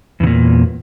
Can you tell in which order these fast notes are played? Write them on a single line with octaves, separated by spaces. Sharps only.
E2 C#3 A#2